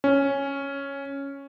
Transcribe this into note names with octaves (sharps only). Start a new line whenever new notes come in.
C#4